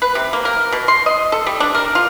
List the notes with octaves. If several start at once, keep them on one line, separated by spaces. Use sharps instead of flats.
B4
C3
A#3
A#4
B2
C6
D#5
A4
G3
D4
A#4
F4